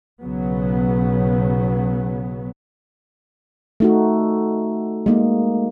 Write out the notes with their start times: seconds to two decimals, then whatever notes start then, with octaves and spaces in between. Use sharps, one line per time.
0.21 B1 C#3 F#3 B3
3.80 A3 D#4 F#4
5.06 G#3 A#3 D#4